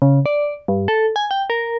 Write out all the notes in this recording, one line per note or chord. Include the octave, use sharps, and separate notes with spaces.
C#3
D5
G2
A4
G#5
G5
A#4